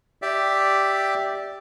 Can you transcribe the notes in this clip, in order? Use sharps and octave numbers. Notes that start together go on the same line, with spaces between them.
G4 D5 E5